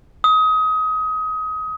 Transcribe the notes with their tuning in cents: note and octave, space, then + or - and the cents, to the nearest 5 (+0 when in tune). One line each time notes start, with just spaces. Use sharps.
D#6 +25